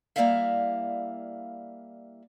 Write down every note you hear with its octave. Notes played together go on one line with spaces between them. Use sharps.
G3 A#3 E4 D5 E5 F5